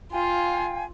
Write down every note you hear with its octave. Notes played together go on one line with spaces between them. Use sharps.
F4 F5 G5 G#5